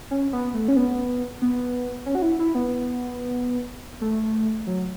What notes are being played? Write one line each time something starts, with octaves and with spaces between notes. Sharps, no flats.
C#4
B3
A3
C#4
B3
B3
C#4
F#4
E4
E4
B3
A3
F#3